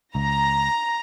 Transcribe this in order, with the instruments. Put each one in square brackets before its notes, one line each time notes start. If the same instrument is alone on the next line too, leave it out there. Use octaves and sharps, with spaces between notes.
[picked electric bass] C#2 [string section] A#5